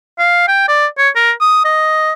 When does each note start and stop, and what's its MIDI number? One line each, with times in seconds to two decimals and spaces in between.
0.19 0.43 77
0.48 0.65 79
0.68 0.87 74
0.98 1.09 73
1.16 1.32 70
1.41 1.61 87
1.65 2.13 75